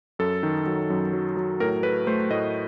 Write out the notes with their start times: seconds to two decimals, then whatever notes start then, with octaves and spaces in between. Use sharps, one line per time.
0.19 F#2 A4
0.43 D#3
0.67 F#3
0.90 F#2
1.13 F#3
1.37 F#3
1.60 A2 A#4
1.83 A3 B4
2.07 A3 C5
2.30 A2 D#5